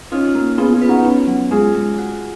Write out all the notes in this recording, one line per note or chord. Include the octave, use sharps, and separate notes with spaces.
C#4 D#4 F4
A#3
B3 F4 G#4
F4 G#4
B4
D#4 F#4
B3 C#4 F4
F#3
G#3 F4 G#4
G#3
F#4